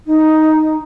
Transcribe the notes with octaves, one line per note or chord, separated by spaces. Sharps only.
D#4